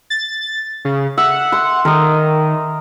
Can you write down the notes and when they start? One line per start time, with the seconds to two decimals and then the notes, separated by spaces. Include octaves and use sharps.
0.10 A6
0.85 C#3
1.18 E5 F#5
1.52 C6
1.85 D#3 A#4 D#5